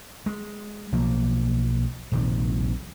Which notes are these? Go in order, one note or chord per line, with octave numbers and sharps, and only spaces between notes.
G#3
B1 F3 A#3
D#1 A#1 C3 D#3